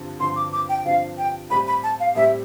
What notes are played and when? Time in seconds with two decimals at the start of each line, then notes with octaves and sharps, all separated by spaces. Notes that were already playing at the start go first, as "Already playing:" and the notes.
Already playing: G2 D3 F3 C4
0.19 G2 D3 F3 C4 C6
0.36 D6
0.53 D6
0.69 G5
0.85 G2 D3 F3 C4 F5
1.18 G5
1.50 A2 G3 C4 G4 B5
1.67 B5
1.83 A5
2.00 F5
2.15 A2 G3 C4 G4 E5